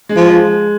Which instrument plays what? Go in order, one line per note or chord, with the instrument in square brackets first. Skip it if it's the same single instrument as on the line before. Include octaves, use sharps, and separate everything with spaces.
[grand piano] G#3
[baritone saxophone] F3
[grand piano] G#3